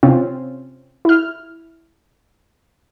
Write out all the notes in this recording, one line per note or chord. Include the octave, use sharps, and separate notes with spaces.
C3 C4 C#4 F4
E4 F6